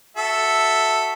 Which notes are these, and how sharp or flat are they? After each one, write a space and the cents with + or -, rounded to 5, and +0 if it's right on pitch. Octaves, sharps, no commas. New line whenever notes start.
F#4 +0 A4 +5 E5 +0